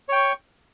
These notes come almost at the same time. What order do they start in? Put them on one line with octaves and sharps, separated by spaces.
C#5 G5 C#6